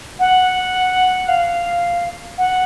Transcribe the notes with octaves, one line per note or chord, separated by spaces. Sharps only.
F#5
F5
F#5